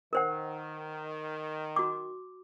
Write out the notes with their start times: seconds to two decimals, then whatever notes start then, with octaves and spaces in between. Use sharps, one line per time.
0.13 D#3 A#4 C5 F#5
1.76 F#4 D6